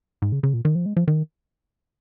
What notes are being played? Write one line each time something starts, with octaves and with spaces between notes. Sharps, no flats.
G#2
C#3
C#3
A#2
D#3
F3
G#3
F3
D#3